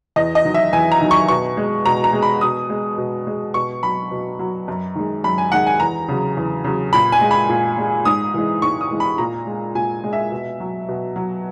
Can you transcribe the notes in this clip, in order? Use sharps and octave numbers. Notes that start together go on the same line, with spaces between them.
E2 D#5
D#5
D#3 F#3
E5
E2 G#5
A#5
D#3 F#3
C#6
B2 C#6
G#3
B2 A#5
A#5
G#3
B5
B2 D#6
G#3
B2
G#3
B2 C#6
F#3 B5
B2
F#3
F#2
D#3 G#3
F#2 B5
G#5
D#3 G#3 F#5
G#5
E2 A#5
C#3 F#3
E2
C#3 F#3
A#2 B5
G#5
G#3
B5
A#2
G#3
G#2 D#6
E3 G#3
G#2 C#6
D#6
E3 G#3
B5
A#2 A#5
G#3
A#2 G#5
G#3
E5
B2
F#3
B2
F#3